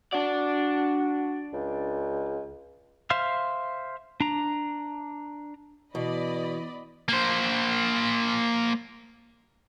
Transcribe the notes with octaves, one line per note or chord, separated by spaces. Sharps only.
D4 F#4 D5
C#2
C5 E5 F5 C6 F6
D4 A#5
B2 E3 D5 D#5 B5
A#3 C5